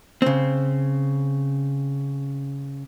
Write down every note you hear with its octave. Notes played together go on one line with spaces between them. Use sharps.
C#3 C4